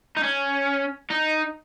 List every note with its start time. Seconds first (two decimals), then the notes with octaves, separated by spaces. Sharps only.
0.16 D#4
0.23 C#4
1.11 D#4